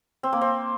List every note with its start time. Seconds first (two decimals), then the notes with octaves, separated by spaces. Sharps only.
0.23 C4
0.33 A#3
0.41 C4